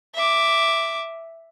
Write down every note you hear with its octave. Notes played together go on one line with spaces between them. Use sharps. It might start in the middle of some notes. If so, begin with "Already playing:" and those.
E5 D6